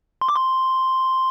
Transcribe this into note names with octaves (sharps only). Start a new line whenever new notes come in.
C6
D6
C6